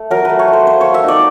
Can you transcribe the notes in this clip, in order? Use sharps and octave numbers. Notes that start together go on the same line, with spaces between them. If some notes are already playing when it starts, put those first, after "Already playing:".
Already playing: A3
F#3 A#4
A3 B4
C#5
A3
C5
A#3 C5
A#3 C#5
E5
D#4 D5